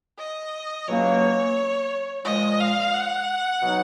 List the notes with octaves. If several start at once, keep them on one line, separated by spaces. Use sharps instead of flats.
D#5
C#2 B2 F#3 A#3 C#4 C#5
A#2 F3 G#3 D#5
F5
F#5
B2 F#3 B3 D#4